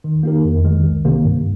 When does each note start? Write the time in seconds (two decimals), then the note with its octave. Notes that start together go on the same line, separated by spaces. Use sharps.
0.04 D#3
0.23 A#3 D#4 G4 A#4
0.45 F2
0.64 D#3 G#3
0.84 C2
1.05 C3 D#3 A#3
1.25 G2